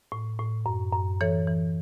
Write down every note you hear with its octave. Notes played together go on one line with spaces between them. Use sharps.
A2
A2
F#2
F#2
E3 A4 C#5
E3